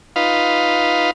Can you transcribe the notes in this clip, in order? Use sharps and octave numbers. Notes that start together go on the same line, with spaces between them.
D#4 F4 B4 F5